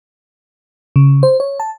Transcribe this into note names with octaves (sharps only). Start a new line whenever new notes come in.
C#3
C5
C#5
A5